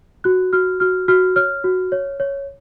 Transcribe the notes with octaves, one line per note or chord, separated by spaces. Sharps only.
F#4 F#6
F#4 F6
F#4 F6
F#4 F6
C#5 F6
F#4
C#5
C#5